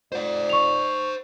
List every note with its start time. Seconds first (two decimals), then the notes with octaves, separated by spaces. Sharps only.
0.12 F2 F4 C5 D5 F#5
0.50 C#6 F7